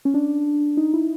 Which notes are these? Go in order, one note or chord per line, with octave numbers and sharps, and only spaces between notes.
C#4
D4
D#4
E4